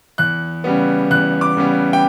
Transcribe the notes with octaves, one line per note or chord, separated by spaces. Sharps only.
E2 F#6
C#3 G3 B3
E2 F#6
D6
C#3 G3 B3
G5